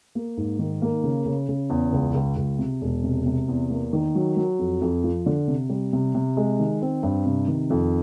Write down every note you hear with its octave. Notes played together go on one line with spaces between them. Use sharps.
A#3
G#2
D#3
A#3
C#3
C#3
C#3
E2
C#2
C#2
C#2
C3
E1
C3
C3
E2
A#3
D#3
F#3
F#3
F2
F2
F3
D3
C3
G3
C3
C3
G#3
D#3
C4
G2
C3
D#3
F2